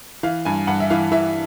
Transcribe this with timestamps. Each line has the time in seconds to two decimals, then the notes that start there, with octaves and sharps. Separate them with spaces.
0.23 E3 F5
0.45 G2 G#5
0.67 G2 F#5
0.80 E5
0.90 E3 F5
1.12 E3 E5